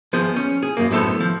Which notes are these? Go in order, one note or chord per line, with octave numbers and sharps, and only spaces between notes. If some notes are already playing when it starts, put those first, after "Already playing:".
F3 B3 G#4 C5
C#4
G#4
F#2 A#3
F#2 A2 B3 A4 C5
F3